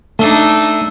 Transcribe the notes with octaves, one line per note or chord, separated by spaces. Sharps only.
A3 D4 D#4 A5 E6 C#7